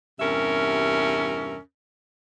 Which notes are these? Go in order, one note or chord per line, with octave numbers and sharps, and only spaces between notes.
E2 G2 C3 C#4 A#4 E5